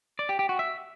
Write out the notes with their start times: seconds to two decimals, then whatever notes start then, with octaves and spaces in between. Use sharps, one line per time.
0.19 D5
0.29 G4
0.39 G4
0.49 F#4
0.59 E5